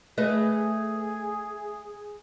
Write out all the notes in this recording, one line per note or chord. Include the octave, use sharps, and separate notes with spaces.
A3 G#4 B4 D#5